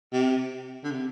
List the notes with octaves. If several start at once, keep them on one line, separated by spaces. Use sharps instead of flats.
C3
D3
C3